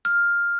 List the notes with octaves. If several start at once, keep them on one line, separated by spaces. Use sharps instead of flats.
F6